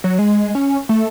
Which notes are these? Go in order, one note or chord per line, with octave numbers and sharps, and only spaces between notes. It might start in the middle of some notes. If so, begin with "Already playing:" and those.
F#3
G#3
C#4
A3